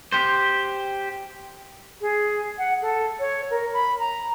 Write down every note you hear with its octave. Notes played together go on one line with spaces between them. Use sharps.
G4 C5
G#4
F#5
A4
C#5
A#4
B5
A#5